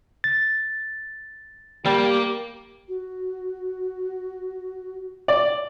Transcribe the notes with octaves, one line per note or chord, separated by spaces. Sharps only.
A6
G3 A#3 G4
F#4
D5